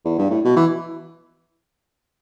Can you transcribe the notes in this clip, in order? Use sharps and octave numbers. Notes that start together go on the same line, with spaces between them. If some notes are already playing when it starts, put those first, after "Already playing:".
E2
G2
A2
B2
E3